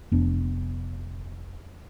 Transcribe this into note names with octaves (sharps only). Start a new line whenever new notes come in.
F1 B3 D4